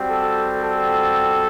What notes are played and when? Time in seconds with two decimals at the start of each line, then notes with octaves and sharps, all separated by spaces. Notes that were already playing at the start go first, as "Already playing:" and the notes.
Already playing: G3 C4 F#4
0.10 A4
0.63 A4